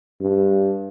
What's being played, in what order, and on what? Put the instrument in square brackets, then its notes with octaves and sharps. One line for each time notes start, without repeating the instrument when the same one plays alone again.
[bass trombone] G2